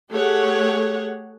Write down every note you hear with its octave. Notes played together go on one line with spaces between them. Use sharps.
A3 G4 G#4 C#5 F#5